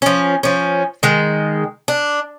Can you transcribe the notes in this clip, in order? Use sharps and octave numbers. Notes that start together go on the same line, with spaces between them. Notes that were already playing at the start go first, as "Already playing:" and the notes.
F3 C#4
F3 C#4
D#3 G#3
D4